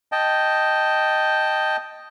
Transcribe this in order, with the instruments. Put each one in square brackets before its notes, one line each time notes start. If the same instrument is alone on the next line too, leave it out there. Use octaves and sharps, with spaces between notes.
[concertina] D#5 G5 A5